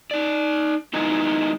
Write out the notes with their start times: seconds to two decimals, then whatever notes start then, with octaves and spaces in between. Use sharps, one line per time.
0.11 D#4 D5
0.93 D#3 G#3 B3 D#4 E4